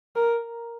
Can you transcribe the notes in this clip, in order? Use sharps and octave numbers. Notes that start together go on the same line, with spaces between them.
A#4